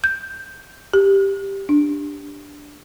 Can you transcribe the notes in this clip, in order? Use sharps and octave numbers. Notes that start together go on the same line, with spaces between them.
G6
G4
D4